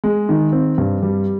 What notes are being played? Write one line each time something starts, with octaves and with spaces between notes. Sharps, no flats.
G#3
D#3
C4
G2
G3